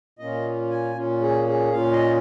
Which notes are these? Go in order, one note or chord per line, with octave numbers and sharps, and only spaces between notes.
A#2 A#3 C#4 F4 D#5
G#5
A#2 A#3 C#4 F4
G#4
G#4
A#2 A#3 C#4 F4 F5
D#5